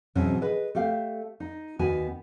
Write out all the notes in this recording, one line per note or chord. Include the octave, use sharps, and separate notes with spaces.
G#2 B2 E3 F#3 C4 C#4
G#4 B4 D#5
A3 G4 F5
D#4
D#2 D#3 B3 F#4 G#5